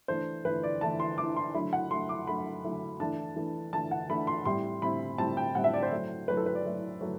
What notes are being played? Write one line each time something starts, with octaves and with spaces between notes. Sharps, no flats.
E3 A3 D4 C5
E3 A3 D4 B4
D5
E3 A3 D4 A5
C6
E3 A3 D4 D6
C6
D3 F#3 A3 E4 B5
F#5
D3 F#3 A3 E4 C6
D6
D3 F#3 A3 E4 B5
D3 F#3 A3 E4
E3 A3 D4 A5
E3 A3 D4
E3 A3 D4 A5
F#5
E3 A3 D4 B5
C6
A2 G3 C4 E4 C6
A2 G3 C4 E4 B5
A2 G3 C4 E4 A5
G5
A2 G3 C4 E4 F#5
E5
D5
C5
F#3 A3 E4
F#3 A3 E4 B4
A4
B4
D5
F#3 A3 E4
F#3 A3